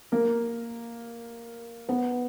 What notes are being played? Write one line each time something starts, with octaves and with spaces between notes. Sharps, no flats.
A#3 A#4
B3 B4